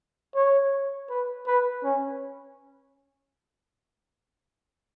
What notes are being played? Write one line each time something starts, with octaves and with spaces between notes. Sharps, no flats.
C#5
B4
B4
C#4